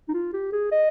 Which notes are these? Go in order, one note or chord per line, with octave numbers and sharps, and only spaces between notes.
D#4
F4
G4
G#4
D#5